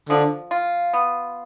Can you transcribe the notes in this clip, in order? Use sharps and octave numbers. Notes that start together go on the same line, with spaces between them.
D3 F3
F4
B3